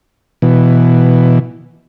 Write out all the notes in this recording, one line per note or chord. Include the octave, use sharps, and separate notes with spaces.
B2 E3